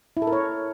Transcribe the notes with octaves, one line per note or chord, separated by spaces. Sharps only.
E4
A4
A#4
C#5